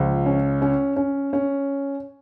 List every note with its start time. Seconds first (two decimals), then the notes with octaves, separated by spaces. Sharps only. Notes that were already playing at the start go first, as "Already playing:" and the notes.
Already playing: C#2 F3
0.26 C#4
0.62 C#4
0.96 C#4
1.33 C#4